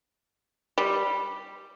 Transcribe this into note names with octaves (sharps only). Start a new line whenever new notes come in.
G3